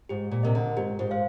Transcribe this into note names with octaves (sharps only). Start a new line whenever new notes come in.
G#2 G4
A#2
C3 A#4 D#5
D3
G#2 G4
G#2
C5 F5